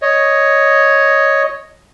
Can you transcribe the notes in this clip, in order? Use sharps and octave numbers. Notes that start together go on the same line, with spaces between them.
C#5 D#5